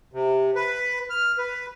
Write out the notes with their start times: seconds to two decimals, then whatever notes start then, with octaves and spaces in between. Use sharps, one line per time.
0.13 C3
0.55 B4
1.10 F6
1.38 B4